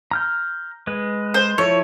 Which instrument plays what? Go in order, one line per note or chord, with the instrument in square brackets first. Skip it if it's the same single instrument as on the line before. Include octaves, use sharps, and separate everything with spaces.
[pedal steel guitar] A#5 F6 G6
G#3 B4
[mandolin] C5
[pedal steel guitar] F3 E4 A4 [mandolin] C#5